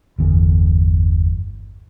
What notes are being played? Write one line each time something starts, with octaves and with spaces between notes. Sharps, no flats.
G1 E2